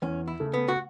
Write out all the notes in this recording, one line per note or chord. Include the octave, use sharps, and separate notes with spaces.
E2 C#4
E4
C#3 A3
B3
F#4